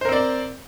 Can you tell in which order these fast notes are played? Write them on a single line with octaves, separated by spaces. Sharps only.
C5 A#4 C4 D5